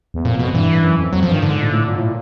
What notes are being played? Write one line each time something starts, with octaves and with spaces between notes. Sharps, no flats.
E2
F2 A#2
F2 B2
G2 E3
G2
F#2
F2
F2 F#3
F3
G2 D#3
G#2 D3
A#2
A2
A#2
A2
A#2